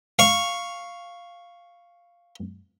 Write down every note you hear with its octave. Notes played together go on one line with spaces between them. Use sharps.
F5 C#6